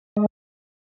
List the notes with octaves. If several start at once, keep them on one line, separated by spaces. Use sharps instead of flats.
G#3